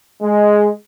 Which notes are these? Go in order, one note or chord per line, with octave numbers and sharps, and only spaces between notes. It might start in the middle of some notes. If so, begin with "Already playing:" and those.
G#3